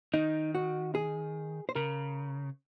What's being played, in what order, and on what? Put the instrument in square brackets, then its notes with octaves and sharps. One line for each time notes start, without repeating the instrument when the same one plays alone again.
[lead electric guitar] D#3 [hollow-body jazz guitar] D#4
[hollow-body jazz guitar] F#4
G#4
C5
[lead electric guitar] C#3 [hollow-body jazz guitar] A#4